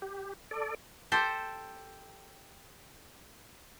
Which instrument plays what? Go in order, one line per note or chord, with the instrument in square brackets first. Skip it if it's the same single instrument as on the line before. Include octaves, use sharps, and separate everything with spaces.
[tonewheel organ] G4
A4 D5
[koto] G4 A4 C5